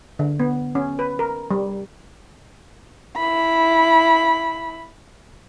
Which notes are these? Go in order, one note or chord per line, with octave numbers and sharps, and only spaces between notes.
D3
B3
C#4
B4
A#4
G3
E4 B5